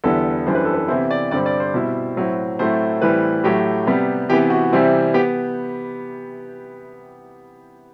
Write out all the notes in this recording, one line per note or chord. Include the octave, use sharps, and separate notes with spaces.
E2 D3 G3 B3 E4 A4
F#2 E3 G3 D4 C5
B4
A4
B4
C3 E3 B3 E4 C5
D5
G2 D3 G3 C4 D5
D5
C5
B2 G3 C4 E4
A2 F#3 C4 E4
A2 F#3 A3 C4 E4 C5
A2 E3 G3 C4 B4
A2 F#3 A3 G4
C3 G3 B3
C3 E3 B3 G4
F#4
C3 E3 G3 C4 E4
B3 G4